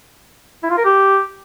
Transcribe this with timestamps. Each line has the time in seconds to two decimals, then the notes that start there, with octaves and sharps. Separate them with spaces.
0.63 E4
0.70 F4
0.77 A#4
0.85 G4